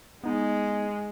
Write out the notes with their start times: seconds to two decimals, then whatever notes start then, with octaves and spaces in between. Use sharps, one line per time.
0.24 G#3 B3 D#4